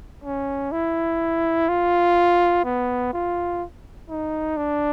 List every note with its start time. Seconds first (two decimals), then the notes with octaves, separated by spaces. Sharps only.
0.24 C#4
0.72 E4
1.69 F4
2.64 B3
3.13 F4
4.09 D#4
4.57 D4